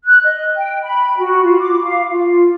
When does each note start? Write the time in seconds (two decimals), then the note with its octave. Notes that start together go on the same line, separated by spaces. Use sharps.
0.05 F#6
0.22 D#5
0.56 G5
0.83 B5
1.18 F#4
1.43 F4
1.60 D6
1.85 F5
2.11 F4